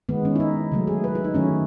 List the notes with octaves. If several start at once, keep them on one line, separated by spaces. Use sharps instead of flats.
D#3 G#3 B3
C#4
E4
D#4
C#3 F#3 A3
G#4
B4
E4
D#4
D#3 F#3 A3 C#4